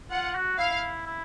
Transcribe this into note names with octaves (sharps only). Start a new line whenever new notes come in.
F4 F#5
F#4
E4 F5
E4